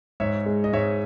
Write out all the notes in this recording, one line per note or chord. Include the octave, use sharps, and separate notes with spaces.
G#2 C#5 E5
G#3
D#5
G#2 C#5 E5